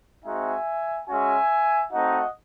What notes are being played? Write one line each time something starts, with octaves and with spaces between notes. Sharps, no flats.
G#3 C4 D#4 F#4 E5 G#5
G#3 C#4 F#4 E5 G#5
A3 C4 D#4 F#4 D#5 F#5